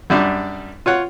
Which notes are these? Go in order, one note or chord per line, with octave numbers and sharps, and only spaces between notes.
F#2 G3 D4
F4 C#5 F#5